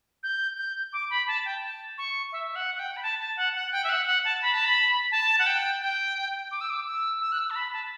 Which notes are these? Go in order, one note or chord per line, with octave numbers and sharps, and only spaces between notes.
G6
G6
D6
B5
A5
G5
A5
C#6
E5
E5
F#5
F#5
G5
B5
A5
A5
F#5
F#5
G5
E5
F#5
F#5
A5
B5
A5
B5
A5
F#5
G5
G5
D6
E6
D6
E6
E6
F#6
E6
A5
B5
A5